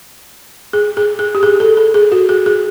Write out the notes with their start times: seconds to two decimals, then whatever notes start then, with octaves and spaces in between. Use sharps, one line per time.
0.73 G#4
0.97 G#4
1.19 G#4
1.35 G4
1.43 G#4
1.60 A4
1.77 A4
1.94 G#4
2.12 F#4
2.29 G#4
2.46 G#4